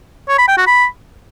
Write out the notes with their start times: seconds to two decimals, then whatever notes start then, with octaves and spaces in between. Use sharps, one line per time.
0.29 C#5
0.38 B5
0.48 G5
0.57 F#4
0.67 B5